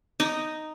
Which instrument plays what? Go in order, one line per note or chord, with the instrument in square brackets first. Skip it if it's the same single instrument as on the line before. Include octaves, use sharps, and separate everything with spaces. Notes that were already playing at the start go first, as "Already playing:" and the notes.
[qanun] D#4